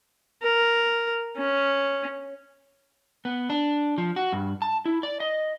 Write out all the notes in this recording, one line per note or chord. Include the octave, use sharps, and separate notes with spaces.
A#4
C#4
B3
D4
F3
F#4
G2
A5
E4
D5
D#5